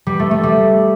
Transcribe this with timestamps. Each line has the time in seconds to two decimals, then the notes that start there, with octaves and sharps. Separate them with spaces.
0.07 G3
0.20 A3
0.31 A3
0.43 G3